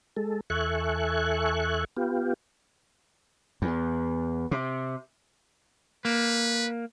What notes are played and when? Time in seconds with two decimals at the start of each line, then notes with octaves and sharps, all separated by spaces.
0.17 G#3 A4
0.50 E2 A4 E5 G#5 C#6 F#6
1.97 B3 F4 G4
3.62 E2
4.51 C3
6.05 A#3 B4